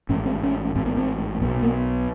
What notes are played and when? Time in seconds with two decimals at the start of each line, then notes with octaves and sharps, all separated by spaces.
0.09 A1 G#2 C#4
0.26 C4
0.43 C#4
0.75 A1 G#2 C4
0.86 B3
0.97 C4
1.42 B1 B3
1.45 B2
1.63 A#3